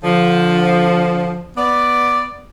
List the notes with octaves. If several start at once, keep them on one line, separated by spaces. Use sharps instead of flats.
D3 F3
B3 D5